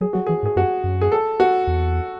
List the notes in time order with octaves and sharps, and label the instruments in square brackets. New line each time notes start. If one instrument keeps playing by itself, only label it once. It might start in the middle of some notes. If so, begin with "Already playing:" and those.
[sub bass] F#3 [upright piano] G#4
[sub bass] F#3 [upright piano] F#4
[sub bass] E3 [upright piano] G#4
[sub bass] G#2
[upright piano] G#4
[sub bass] F#2 [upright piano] F#4
[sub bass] F#2
[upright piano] G#4
A4
F#4
[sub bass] E2